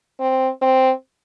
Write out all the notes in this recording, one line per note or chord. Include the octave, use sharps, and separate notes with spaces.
C4
C4